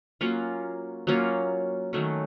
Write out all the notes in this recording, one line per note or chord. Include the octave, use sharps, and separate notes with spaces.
F#3 A#3 C#4 F4
F#3 A#3 C#4 F4
D#3 F#3 A3 C#4